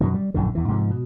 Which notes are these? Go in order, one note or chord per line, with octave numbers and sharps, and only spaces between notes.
F#2 B2 D#3
G3
A#1 F#2 A2 D3
E2 E3
G#2 C3 F3
B2